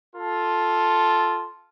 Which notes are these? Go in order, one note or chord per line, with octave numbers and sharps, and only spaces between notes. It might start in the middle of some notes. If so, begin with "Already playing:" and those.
F4 A4